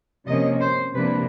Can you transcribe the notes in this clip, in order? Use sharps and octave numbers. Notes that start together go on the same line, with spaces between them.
C3 F3 A#3 C#4 D#5
C5
C3 F3 A#3 D4 B4